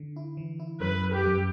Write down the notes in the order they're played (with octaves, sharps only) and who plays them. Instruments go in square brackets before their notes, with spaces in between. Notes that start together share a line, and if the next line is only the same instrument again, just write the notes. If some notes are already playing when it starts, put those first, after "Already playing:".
Already playing: [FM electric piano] D3
E4
E3
E4
[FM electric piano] F#2 [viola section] B4
[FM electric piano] F#2
[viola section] G4
[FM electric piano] F#2